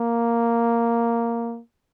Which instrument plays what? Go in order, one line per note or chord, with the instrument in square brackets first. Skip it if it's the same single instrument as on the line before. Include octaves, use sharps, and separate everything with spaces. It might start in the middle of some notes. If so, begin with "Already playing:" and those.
Already playing: [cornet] A#3